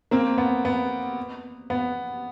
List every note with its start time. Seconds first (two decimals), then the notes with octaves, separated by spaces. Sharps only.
0.11 A#3 C4
0.38 B3
0.65 B3
1.70 B3